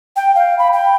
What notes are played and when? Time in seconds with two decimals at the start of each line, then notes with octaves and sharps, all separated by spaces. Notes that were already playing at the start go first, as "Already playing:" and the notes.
0.16 G5
0.35 F5
0.59 B5
0.73 G5